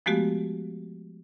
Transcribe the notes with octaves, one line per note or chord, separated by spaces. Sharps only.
F3 G#3 A3 B3 F#4 G4